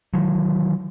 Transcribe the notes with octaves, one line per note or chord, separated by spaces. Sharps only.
D#3 E3 F#3